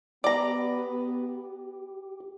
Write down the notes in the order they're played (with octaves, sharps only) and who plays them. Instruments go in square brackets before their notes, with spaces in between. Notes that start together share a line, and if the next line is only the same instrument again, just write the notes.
[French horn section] B3 [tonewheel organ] G4 [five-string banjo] D5 A#5